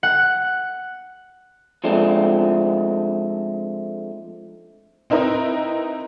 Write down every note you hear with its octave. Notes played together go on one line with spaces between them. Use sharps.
F#5
F3 G#3 A3 C4 D4 D#4
C4 D#4 E4 A#4 B4 D#5